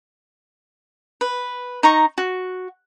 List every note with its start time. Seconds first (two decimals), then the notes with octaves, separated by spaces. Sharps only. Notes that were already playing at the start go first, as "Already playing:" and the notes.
1.21 B4
1.83 D#4 A#5 C#6
2.18 F#4